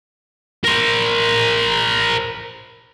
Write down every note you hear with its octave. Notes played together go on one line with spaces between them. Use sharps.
A#4 C5